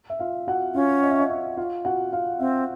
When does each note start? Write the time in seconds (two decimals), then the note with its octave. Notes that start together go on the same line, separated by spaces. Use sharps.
0.10 E5
0.19 F4 F5
0.47 F#4 F#5
0.74 C#4 F4 F5
1.03 D#5
1.11 E5
1.19 D#5
1.30 E5
1.57 F4 F5
1.85 F#4 F#5
2.12 F4 F5
2.39 C4 E5